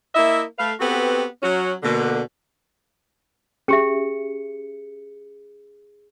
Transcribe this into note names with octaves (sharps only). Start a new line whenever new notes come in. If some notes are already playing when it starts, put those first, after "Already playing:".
A#3 E4 D#5 E5
A3 B4 F5
B3 C4 F#4 G4 A4 B4
F#3 C#4 F#4
B2 D3 A#3
C#4 G4 G#4 E5 C#7